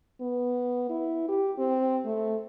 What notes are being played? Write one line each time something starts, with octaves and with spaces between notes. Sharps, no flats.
B3
E4
G4
C4
A3